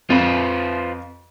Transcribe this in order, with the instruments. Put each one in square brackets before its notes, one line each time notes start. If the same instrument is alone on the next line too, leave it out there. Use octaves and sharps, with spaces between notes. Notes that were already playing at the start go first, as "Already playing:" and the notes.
[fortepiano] F2 [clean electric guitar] F4 B4 C5